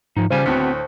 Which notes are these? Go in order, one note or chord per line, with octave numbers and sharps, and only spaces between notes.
G#2 F3 D#4
C#2 C#3 F3 G3 F4 C5 G#5
D2 A2 B3 C4 F#4